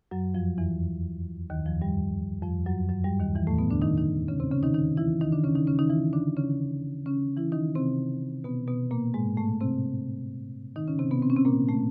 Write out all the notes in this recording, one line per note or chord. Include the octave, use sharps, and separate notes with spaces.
F#2 F#3
F2 F3
E2 E3
D#2 D#3
F2 F3
G2 G3
F2 F3
F#2 F#3
F#2 F#3
G2 G3
D#2 D#3
E2 E3
A2 A3
B2 B3
D3 D4
D#3 D#4
D#3 D#4
C#3 C#4
C3 C4
C#3 C#4
D#3 D#4
D#3 D#4
E3 E4
D#3 D#4
D3 D4
C#3 C#4
D#3 D#4
C#3 C#4
D#3 D#4
E3 E4
D3 D4
C#3 C#4
C#3 C#4
E3 E4
D#3 D#4
C3 C4
B2 B3
B2 B3
A#2 A#3
G#2 G#3
A2 A3
C3 C4
D#3 D#4
C#3 C#4
C3 C4
B2 B3
C4
C#4
C3 C4
A#2 A#3
A2 A3